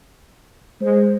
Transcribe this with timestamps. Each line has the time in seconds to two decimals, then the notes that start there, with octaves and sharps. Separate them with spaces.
0.81 G#3 C5